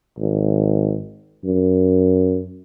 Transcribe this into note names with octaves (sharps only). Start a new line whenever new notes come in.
G#1
F#2